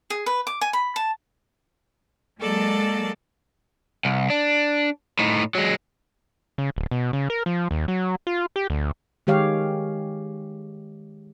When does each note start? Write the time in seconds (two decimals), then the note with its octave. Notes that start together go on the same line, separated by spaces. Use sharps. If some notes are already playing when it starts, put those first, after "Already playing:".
0.10 G#4
0.26 B4
0.47 D6
0.61 G#5
0.73 B5
0.96 A5
2.40 F#3 G#3 A#3 A4 D5 A5
4.05 C2
4.30 D4
5.19 A2 D#4
5.55 F#3 G#3
6.58 C#3
6.76 D1
6.91 B2
7.13 C#3
7.30 A#4
7.46 F3
7.71 D#2
7.88 F#3
8.27 F4
8.56 G4
8.70 D2
9.27 D#3 G#3 G4 C#5 F5